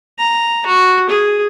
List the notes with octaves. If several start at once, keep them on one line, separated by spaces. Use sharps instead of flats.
A#5
F#4
G#4